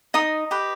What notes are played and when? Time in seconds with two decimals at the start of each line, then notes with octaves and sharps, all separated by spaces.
0.14 D#4 D#5 D#6
0.51 G4 B4